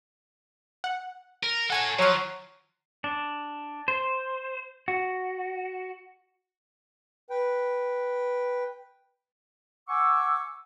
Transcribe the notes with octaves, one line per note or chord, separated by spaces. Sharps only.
F#5
A#4
A4 C#5 F#5 G#5 G#6
F3 F#3 C#5 F6
D4
C5
F#4
B4 G5
F#5 G#5 C#6 D6 E6